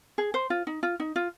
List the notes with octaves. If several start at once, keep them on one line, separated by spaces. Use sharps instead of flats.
G#4
C5
F4
D#4
F4
D#4
F4